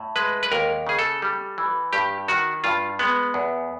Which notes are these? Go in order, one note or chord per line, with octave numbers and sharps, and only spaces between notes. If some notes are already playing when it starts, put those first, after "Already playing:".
Already playing: A2
G#3 B4
B4
D#2 A#4
C#3 G#4
A4
G3
E3
G2 G4
D#3 F#4
G2 F4
G#3 B3
E2